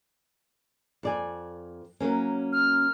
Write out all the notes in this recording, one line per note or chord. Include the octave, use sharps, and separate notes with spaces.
F2 D5 G#5
F#3 A#3 C#4
F6